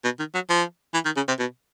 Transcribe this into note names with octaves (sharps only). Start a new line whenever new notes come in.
B2
D#3
F#3
F3
E3
D#3
C#3
C3
B2